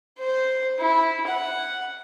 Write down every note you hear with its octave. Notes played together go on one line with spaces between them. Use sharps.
C5
E4
F#5